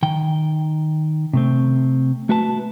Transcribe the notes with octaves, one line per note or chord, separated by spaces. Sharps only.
D#3 G5
C3 A3 C4
A3 F#4 B4 A5